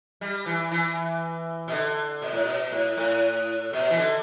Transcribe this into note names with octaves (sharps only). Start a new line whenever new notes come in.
G3
E3
E3
B2
D3
B2
A2
B2
A2
A2
B2
E3
D3